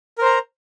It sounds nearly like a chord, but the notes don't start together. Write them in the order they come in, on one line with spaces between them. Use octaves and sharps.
A#4 C5 A#5